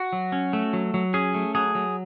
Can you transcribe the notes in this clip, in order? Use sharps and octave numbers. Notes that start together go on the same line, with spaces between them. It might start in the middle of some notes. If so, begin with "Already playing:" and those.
Already playing: F#4
F#3
C#4
A3
F#3
F#3
C#4 G#4
A3
F#3 G#4
F#3